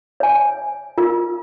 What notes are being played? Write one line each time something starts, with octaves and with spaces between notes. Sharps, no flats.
C#5 G#5
F4 A#4